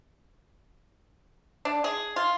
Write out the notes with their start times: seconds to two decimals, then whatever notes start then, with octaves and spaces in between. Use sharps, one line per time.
1.65 D4
1.84 G#4
2.16 F4